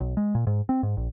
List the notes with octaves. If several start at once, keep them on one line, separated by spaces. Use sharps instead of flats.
B1
G#3
A#2
G#2
C4
G#2
A#1